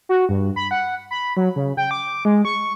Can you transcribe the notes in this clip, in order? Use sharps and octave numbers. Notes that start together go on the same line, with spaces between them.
F#4
G2
B5
F#5
B5
F#3
C#3
G5
D6
G#3
C#6